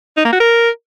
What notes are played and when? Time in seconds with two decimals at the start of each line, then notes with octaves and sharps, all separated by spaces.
0.17 D#4
0.25 A#3
0.32 F#4
0.40 A#4